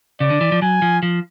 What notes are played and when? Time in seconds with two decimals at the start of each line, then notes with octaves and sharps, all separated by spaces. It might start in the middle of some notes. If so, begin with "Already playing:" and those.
0.20 C#3 D5
0.30 D3
0.41 E3
0.52 F3
0.62 F#3 G#5
0.82 F3
1.03 F3